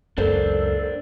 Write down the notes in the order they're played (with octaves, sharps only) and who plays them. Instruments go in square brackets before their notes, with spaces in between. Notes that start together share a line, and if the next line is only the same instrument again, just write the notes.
[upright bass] C#2 F#2 [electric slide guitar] D4 A#4 C5 [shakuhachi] A4